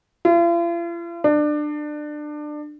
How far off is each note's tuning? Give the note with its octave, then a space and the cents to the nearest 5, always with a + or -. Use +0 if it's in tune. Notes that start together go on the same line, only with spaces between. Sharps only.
F4 -45
D4 +25